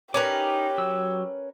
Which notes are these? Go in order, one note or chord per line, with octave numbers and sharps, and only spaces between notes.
C#4 D#4 G4 A#4 B4 A#5 D6
F#3 E6